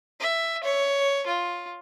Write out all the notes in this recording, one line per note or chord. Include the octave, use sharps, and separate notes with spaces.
E5
C#5
F4